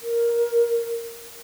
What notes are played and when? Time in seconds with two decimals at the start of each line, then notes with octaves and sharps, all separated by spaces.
0.01 A#4